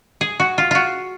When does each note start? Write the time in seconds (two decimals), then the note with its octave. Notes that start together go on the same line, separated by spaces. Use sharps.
0.21 G#4
0.40 F#4
0.58 F4
0.71 F4 F#4